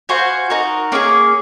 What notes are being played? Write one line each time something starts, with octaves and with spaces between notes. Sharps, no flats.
F#4 C5 F5 G#5
D#4 F#4 A#4
A#3 C#4 F4 G#4